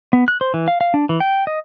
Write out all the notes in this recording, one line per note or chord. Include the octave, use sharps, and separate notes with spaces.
B3
F#6
C5
E3
F5
F5
D4
E3
G5
D#5